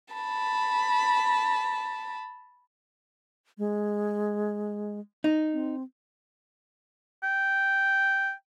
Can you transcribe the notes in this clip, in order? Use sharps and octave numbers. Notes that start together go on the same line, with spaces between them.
A5 B5
G#3
D#4
C4
G5